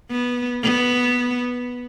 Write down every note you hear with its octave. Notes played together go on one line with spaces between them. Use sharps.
B3
B3